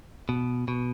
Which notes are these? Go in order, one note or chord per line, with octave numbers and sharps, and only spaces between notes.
B2
B2